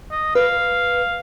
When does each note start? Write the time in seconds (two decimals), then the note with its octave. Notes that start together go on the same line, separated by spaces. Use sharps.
0.11 D#5
0.35 B4 F5